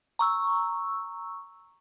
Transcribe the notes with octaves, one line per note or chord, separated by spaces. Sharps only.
A#5 C#6 E6